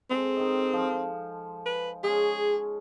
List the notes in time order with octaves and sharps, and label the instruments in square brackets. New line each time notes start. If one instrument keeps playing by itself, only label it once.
[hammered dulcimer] G#3 A4 [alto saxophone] C4
[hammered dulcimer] D#3 D#5
F3
[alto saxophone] B4
[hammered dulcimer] G#3 C#4 [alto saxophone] G#4